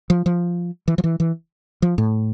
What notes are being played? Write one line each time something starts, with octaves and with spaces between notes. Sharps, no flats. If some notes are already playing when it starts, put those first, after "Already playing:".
F3
F3
E3
F3
E3
E3
F3
A2